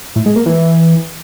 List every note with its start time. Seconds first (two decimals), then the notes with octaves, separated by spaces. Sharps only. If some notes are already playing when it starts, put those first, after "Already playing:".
0.16 A2
0.26 G#3
0.36 A#3
0.46 E3